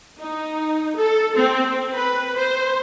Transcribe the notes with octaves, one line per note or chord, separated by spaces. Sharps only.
D#4
A4
C4
B4
C5